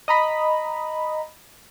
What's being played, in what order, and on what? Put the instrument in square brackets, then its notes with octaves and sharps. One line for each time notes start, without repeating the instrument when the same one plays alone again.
[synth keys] D#5 A#5 B5